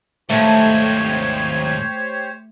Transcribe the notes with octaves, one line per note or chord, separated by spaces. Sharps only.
D#2 G#2 A3 G4 C5 C#5